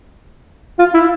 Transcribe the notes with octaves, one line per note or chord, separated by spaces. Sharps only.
F4
E4